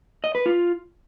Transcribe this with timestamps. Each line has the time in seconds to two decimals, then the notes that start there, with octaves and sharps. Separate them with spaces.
0.24 D#5
0.35 B4
0.46 F4